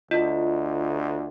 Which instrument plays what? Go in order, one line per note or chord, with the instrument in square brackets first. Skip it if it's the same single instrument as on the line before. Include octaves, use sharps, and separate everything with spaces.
[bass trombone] D2 [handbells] F4 D#5